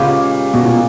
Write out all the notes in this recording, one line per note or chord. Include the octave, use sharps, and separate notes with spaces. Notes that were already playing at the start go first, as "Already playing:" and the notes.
Already playing: A#2 C#3 G#3 B3 G4
B2
A#2